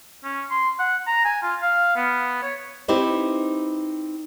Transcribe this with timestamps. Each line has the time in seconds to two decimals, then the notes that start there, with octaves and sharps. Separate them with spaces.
0.24 C#4
0.51 C6
0.79 F#5
1.07 A#5
1.25 G#5
1.43 F4
1.62 F5
1.96 B3
2.43 C#5
2.88 C4 D#4 E4 G4 B4 C5